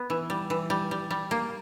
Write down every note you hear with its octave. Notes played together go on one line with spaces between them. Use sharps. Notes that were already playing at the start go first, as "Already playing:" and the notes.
Already playing: B3
E3
G3
E3
G3
G3
G3
A#3